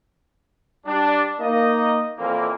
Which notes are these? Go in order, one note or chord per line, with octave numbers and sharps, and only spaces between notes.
G3 D4
A#3 D#4 D#5
F2 A#2 E3 A#3